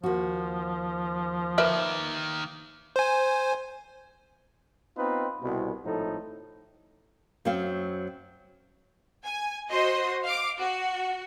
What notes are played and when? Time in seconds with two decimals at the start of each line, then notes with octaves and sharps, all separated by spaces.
0.03 D#2 F3 F#4
1.58 D#3 A#3 A#4 B4 E5
2.96 C5 G#5
4.96 B3 C4 D#4 F4 B4
5.41 C2 B2
5.84 G#1 A2 F3 D#4 A4
7.45 F#2 F#3 C4 F5 G5
9.24 G#5
9.70 F#4 C5 D#5 C6
10.24 F5 D6
10.58 F#4